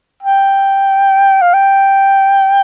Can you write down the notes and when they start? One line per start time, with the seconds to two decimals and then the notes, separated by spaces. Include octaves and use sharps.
0.23 G5
1.42 F5
1.54 G5